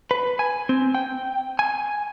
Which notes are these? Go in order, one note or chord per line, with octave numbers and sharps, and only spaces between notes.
B4
G#5
C4
G5
G#5